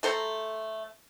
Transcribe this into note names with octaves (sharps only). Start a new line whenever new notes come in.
A3 A4 C5 A#5